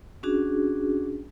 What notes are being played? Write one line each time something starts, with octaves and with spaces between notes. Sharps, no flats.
C#4 D4 F#4 G#4